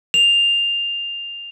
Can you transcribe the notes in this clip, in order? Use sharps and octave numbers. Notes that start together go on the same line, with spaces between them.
F7